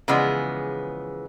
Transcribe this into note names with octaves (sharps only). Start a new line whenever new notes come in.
C#3 E3 F3 G#3 B3